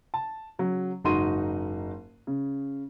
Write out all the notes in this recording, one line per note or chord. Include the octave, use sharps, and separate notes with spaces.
A5
C#3 F#3
F#1 G#2 D#4 F#4 C6 D#7
C#3